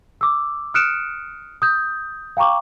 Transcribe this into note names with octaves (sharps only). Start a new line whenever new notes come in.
D6 E6
D#6 F6 F#6 C#7 D7 E7
D#6 G6
F5 G5 A#5 C#6 D6